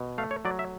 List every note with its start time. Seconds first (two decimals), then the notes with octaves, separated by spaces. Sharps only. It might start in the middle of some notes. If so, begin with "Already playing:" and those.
Already playing: B2
0.18 A3 F5
0.31 C#5
0.45 F#3 D5
0.59 E5